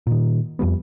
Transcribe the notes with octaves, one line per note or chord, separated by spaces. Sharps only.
A#2 D#3
F2 F3 G3 B3